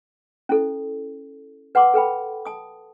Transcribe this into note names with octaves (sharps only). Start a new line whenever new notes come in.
C#4 E4 A4
B4 F#5 A5 C6 D6 E6
A4 B4 G5 B5
A5 D#6